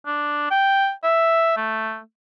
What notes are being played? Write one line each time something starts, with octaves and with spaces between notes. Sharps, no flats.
D4
G5
E5
A3